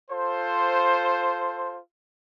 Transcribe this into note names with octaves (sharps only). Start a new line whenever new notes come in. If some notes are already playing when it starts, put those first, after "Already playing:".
F4 A4 C5